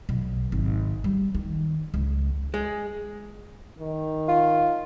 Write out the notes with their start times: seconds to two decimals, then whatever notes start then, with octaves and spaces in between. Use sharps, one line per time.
0.09 B1
0.52 G#1
1.04 G3
1.35 D#3
1.94 C#2
2.54 G#3
3.79 D#3
4.28 F4